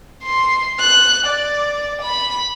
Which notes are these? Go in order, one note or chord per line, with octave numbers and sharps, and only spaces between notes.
C6
F#6
D5
B5